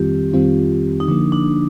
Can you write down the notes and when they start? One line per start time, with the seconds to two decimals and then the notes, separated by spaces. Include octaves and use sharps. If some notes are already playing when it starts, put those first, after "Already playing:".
Already playing: F2 D#3 G3 C4 F4 G4
0.34 F2 D#3 G3 C4 F4
1.00 D#4
1.08 D3 F3 A#3 D4
1.32 D4